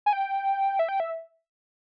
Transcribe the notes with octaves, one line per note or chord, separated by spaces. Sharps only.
G#5
G5
E5
G5
E5